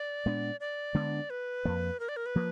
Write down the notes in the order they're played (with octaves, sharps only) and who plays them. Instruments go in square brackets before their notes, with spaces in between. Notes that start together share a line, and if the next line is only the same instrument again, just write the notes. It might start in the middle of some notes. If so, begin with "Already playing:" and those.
Already playing: [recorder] D5
[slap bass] A#2 G#3 B3 D4
[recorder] D5
[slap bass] D3 G#3 B3 D4
[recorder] B4
[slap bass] F2 F3 A#3
[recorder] A#4
D5
A#4
B4
[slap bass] F3 A#3